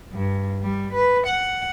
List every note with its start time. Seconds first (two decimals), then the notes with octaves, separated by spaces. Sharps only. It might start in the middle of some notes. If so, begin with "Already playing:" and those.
0.12 G2
0.62 G3
0.94 B4
1.27 F#5